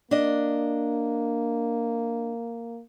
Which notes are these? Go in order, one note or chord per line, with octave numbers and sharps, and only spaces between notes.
A#3 D4 D#5